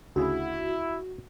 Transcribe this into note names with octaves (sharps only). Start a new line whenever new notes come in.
D2 C#3 E4 F#4 G#4